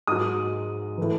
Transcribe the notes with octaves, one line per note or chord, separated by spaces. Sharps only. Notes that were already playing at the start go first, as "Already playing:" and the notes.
G#2 F#3 D#6
A2 E3